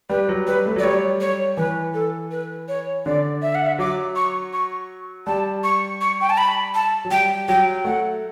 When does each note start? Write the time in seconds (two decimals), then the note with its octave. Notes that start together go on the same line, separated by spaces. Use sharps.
0.10 G3 B4
0.29 F#3
0.46 G3 B4
0.66 A3
0.76 F#3 D5
0.83 G3 C#5
1.21 C#5
1.57 E3 B4
1.94 A4
2.31 B4
2.68 C#5
3.05 D3 D5
3.42 E5
3.55 F#5
3.67 E5
3.79 F#3 D6
4.16 C#6
4.53 C#6
5.27 G3 A5
5.64 C#6
6.01 C#6
6.21 G5
6.30 A5
6.38 B5
6.75 A5
7.05 F#3
7.11 G3 G5
7.48 F#3 G5
7.85 A3 F#5